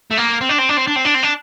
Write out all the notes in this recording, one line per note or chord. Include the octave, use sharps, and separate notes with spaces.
A3
A#3
C4
D4
C4
D4
C4
D4
C4
D4
C4
D4